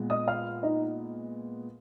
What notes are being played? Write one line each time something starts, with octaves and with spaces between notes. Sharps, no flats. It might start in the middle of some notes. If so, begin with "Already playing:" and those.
Already playing: A#2 G#3 B3
D#5 D#6
F5 F6
D#4 D#5